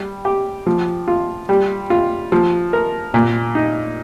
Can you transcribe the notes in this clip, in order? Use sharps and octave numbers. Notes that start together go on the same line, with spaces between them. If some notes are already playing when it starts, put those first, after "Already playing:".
Already playing: G3
G4
F3
F4
G3
F4
F3
A#4
A#2
D#4